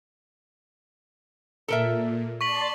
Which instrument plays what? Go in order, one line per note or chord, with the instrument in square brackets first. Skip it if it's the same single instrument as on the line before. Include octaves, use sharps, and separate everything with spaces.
[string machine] A#2 [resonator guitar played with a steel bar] A4 A#4 E5
[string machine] D5 A5 C6 [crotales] C#6 B6 F#7